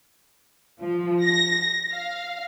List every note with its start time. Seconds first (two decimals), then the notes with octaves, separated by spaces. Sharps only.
0.82 F3
1.23 A#6
1.93 F5